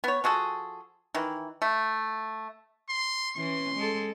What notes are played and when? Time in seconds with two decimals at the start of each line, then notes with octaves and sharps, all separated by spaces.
0.04 B3 C#5
0.24 F3 F#4 G#4 A4
1.14 D#3 E3
1.62 A3
2.89 C6
3.36 E3 C#4 C6
3.75 G#3 A4